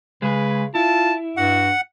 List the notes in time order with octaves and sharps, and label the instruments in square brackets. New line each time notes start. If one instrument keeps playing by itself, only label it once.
[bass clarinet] C#3 [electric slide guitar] G#3 G#4 [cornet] B4
[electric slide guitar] E4 [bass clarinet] F4 [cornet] A5
[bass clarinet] G2 [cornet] F#4 [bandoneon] F#5